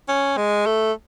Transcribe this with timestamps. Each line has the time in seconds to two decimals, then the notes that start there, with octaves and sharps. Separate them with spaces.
0.08 C#4
0.37 G#3
0.66 A3